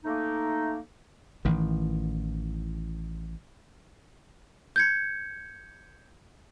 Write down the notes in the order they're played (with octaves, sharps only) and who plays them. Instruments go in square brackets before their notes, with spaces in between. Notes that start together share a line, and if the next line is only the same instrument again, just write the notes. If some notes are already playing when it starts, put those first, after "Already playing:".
[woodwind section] A3 A#3 D#4
[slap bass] A1 D#3 E3
[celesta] G6 G#6 C#7